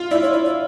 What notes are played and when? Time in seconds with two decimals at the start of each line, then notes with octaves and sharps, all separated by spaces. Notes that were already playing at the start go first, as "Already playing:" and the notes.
Already playing: F4
0.11 E4 D5
0.22 C#5
0.33 D5
0.44 D5